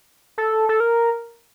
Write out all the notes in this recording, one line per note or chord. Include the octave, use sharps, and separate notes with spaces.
A4
A4
A#4